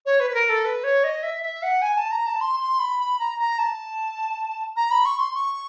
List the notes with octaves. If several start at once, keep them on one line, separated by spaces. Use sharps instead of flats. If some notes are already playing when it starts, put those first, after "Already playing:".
C#5
B4
B4
A#4
A4
B4
C#5
D#5
E5
E5
F#5
G#5
A5
A#5
A5
C6
C6
B5
B5
A#5
A#5
A5
A#5
B5
C#6
C6
C#6